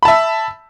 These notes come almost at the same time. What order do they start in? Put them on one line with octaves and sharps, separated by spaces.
B5 A5 E5